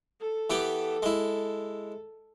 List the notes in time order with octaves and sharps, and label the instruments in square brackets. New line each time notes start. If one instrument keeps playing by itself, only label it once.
[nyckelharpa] A4
[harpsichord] E3 B3 G4
G#3 E4